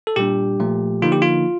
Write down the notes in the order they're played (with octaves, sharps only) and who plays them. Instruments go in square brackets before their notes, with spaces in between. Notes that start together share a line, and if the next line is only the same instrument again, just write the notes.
[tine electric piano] A4
A#2 G3 D4 G4
A#2 F3 A3
D3 F3 A#3 D#4 F4
G4
F4